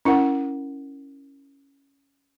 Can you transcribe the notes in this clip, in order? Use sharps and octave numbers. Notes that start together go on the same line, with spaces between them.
C#4 E4 A#4 F#5